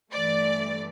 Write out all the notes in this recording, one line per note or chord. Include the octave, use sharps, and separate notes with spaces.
G2 E3 A3 D5